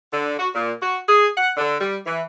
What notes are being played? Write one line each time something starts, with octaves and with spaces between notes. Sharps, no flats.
D3
F#4
A#2
F#4
G#4
F#5
D3
G3
E3